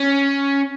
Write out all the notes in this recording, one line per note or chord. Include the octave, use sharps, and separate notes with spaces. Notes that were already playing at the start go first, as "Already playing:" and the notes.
Already playing: C#4